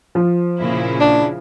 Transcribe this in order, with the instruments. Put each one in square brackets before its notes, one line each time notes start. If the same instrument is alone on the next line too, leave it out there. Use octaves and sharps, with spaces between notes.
[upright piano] F3
[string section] A#2 C#3 E4
[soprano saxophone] D4